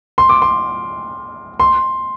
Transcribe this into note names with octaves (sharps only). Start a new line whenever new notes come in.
C6
D6
C6
C6